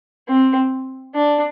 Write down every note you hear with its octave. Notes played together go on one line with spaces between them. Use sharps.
C4
D4